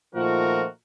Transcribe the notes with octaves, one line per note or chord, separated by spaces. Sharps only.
A#2 D#3 F3 A3 F#4 A#4